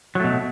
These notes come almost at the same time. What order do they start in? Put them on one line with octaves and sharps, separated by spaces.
F#3 A3 B2